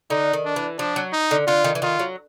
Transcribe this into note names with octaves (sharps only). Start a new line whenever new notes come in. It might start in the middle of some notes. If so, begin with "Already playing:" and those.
D3 D#4
D#3
D4
E3
F3 D4
F#3
D#4
D3
D3 F4
D#3
E3
D#3 F4
F#3